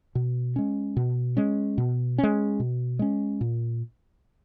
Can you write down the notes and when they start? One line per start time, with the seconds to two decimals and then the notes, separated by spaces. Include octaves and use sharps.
0.15 B2
0.56 G#3 C#4
0.97 B2
1.37 G#3 C#4
1.78 B2
2.18 G#3 C#4
2.60 B2
2.99 G#3 C#4
3.41 A#2